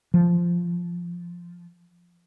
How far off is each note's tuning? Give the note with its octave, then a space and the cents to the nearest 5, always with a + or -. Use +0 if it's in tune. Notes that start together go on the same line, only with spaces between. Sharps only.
F3 -5